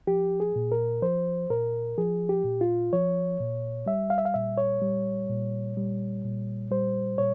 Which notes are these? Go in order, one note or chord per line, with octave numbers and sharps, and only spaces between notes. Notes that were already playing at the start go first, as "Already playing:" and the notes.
F3 G4
G#4
A#2
A#4
F3 C5
A#2 A#4
F3 G#4
G4
A#2
F4
F3 C#5
A#2
G3 E5
F5
E5
F5
A#2 E5
C#5
G3
A#2
G3
A#2
G3 C5
A#2 C#5